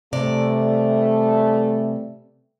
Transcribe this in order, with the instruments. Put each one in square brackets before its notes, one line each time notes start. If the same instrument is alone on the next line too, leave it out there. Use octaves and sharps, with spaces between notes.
[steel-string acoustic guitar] C3 D5 [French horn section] E3 G3 A3